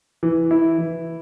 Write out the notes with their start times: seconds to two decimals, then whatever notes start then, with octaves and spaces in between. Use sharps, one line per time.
0.23 E3
0.51 E4
0.78 E3